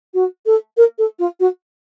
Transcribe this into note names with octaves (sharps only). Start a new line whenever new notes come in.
F#4
A4
A#4
A4
F4
F#4